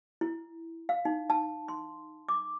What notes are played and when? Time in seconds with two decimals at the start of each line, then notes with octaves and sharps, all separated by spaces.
0.21 E4
0.89 F5
1.05 D#4
1.30 A5
1.68 C6
2.29 D6